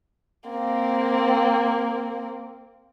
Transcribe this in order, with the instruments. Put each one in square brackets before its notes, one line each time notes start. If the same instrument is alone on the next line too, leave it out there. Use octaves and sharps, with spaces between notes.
[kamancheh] A#3 C4